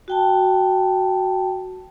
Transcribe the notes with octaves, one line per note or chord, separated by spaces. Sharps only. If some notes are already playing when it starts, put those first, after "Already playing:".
F#4 G5 A5